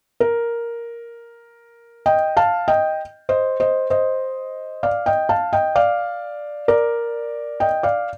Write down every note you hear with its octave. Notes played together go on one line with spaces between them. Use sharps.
A#4
D#5 G5
F5 A5
D#5 G5
C5 D#5
C5 D#5
C5 D#5
D5 F5
D#5 G5
F5 A5
D#5 G5
D5 F5
A#4 D5
D#5 G5
D5 F5